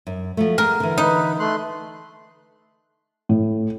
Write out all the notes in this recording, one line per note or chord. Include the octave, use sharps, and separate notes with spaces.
F#2
F3 F#3 A3
G#4 A#4 F#5
D3 E3
D#4 B4
A3 C6 F#6
A2